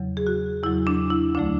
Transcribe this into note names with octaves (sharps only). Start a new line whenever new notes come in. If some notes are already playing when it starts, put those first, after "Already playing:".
Already playing: E2 C#3 F#3
G#4
F#4
E2 C#3 F#3 E4
D4
E4
D2 D3 F#3 A3 D4